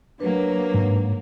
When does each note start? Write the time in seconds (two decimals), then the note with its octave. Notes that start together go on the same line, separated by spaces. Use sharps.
0.20 F#3 A#3 D4 B4
0.74 G#2